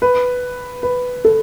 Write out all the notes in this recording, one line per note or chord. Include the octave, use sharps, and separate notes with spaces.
B4
B4
A4